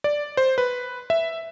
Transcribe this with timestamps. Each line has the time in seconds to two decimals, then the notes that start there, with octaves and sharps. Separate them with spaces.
0.04 D5
0.37 C5
0.58 B4
1.10 E5